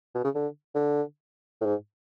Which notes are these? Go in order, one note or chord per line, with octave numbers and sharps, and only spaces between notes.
B2
C#3
D3
D3
A2
G#2